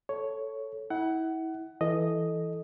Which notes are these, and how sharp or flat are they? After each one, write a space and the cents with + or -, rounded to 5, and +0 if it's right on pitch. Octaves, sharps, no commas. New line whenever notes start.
A4 +0 C#5 +5
E4 -30 F#5 +20
E3 +0 A4 -5 D#5 +0